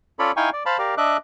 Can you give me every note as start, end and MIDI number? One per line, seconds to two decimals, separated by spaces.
0.19 0.32 61
0.19 0.32 65
0.19 0.32 69
0.19 0.32 73
0.19 0.32 74
0.19 0.32 83
0.37 0.50 63
0.37 0.50 64
0.37 0.50 77
0.37 0.50 79
0.37 0.50 80
0.37 0.50 85
0.53 0.63 74
0.66 0.78 72
0.66 0.78 77
0.66 0.78 81
0.66 0.78 83
0.79 0.95 67
0.79 0.95 70
0.79 0.95 74
0.79 0.95 77
0.97 1.17 62
0.97 1.17 75
0.97 1.17 76
0.97 1.17 86
0.97 1.17 90